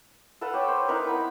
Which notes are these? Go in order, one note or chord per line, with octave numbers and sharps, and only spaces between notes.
A4 B4 F5 F#5
G4 C#5
C5
D#4 E4 A#4 B4
B3 B5